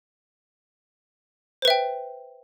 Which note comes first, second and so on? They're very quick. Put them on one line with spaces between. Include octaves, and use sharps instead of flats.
C5 B4 E5 G5